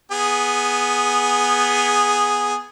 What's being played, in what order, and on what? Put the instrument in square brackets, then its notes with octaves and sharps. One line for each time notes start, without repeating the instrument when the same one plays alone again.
[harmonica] B3 G#4